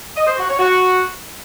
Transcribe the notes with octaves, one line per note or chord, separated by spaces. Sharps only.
D#5
C5
F#4
C#5
F#4